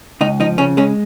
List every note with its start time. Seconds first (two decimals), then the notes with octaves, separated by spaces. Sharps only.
0.21 C#2 D#4
0.40 F3 D#4
0.58 C#3 C#4
0.77 G#3 C#4